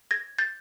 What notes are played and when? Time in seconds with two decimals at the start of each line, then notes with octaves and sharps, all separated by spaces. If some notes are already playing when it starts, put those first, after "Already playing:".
0.11 G#6 A#6
0.38 G6 A6